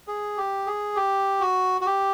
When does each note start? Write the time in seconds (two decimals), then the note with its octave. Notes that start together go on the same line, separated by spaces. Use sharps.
0.08 G#4
0.38 G4
0.67 G#4
0.96 G4
1.41 F#4
1.81 F#4
1.86 G4